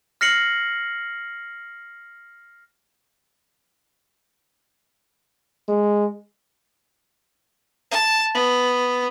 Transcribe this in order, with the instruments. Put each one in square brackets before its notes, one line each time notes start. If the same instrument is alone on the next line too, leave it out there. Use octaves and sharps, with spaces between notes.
[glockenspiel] F6 A#6 C7 C#7 F#7
[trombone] G#3
[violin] A5
B3